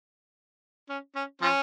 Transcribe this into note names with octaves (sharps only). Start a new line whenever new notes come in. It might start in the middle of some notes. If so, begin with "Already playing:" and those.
C#4
C#4
F3 C#4